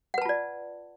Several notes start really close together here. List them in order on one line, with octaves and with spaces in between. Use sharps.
F#5 B4 A5 F4 D5